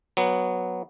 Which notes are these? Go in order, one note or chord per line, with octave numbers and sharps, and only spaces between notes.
F#3 B3